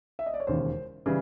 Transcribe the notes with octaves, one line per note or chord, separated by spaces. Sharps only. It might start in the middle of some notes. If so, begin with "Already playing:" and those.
E5
D#5
D5
C#5
E1 D#2 C#3 C5
C#3 E3 G3